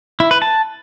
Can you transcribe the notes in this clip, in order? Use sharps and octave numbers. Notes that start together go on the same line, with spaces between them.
E4
B4
A5